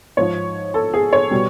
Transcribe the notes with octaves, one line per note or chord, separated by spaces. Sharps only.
G#2 F3 C#5
A4
G#4
C#5
B2 G3